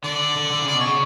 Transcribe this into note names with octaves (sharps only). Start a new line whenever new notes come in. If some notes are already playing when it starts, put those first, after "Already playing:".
D3 D5
D3
D3
C#3
D5
B2
C#5
C#3